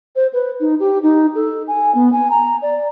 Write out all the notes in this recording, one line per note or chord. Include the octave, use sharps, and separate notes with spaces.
C5
B4
D#4
G4
D#4
A4
G#5
B3
G#5
A#5
D5